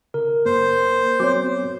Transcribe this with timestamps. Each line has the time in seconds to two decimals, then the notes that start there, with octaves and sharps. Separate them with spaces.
0.14 C#3 A#4
0.46 F#2 A#3 C5
1.20 F#3 B3 C4 F#4 C#5 D6